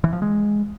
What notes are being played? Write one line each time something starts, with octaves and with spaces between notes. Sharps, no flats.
E3
F3
G#3